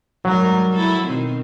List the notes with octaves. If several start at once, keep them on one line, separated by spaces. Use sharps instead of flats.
G#2 F#3 G3 A#4
E4 A4
B2 D#3 C4